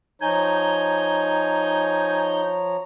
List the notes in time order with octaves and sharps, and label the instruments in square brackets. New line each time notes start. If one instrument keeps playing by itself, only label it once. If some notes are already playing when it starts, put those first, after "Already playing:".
[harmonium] F3 C#5 A#5 [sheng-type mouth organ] D#4 G6 [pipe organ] G#5